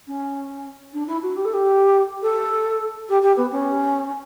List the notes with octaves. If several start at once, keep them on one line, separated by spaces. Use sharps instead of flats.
C#4
D4
E4
F#4
G4
A4
G4
A4
G4
G4
B3
C#4